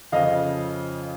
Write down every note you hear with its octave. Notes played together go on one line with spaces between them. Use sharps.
F2 C#3 F3 D#5 F5